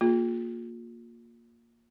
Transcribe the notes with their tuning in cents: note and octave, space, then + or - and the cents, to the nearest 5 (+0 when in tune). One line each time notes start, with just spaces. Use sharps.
A#3 +0 F4 +30 G#4 +0